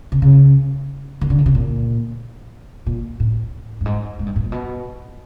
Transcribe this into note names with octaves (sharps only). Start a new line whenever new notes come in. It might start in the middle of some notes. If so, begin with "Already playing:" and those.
C3
C#3
D#3
D3
C#3
C3
A#2
A#2
A2
G2
G#2
G#2
G2
G#2
A#2
B2